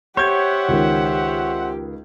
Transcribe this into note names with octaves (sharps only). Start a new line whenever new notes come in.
G4 C5 C#5 E5 F#5 G6 G#6
C#2 D#3